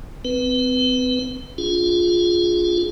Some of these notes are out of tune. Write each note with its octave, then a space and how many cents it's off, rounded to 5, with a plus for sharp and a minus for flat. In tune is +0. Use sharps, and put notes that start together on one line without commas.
C4 -35 B4 +0
D4 -40 F4 +5 G#4 +0